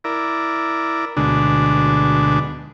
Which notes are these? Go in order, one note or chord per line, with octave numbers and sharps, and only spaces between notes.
E4 A#4 D5
D2 B2 D3 G#3 D4